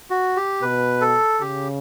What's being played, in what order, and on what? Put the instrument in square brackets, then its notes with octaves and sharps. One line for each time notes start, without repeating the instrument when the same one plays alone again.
[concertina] F#4
G4
[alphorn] B2 [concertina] B4
[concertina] A4
[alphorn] C#3 [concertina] G4